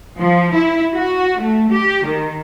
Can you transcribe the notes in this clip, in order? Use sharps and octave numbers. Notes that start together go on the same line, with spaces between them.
F3
E4
F#4
A3
G4
D#3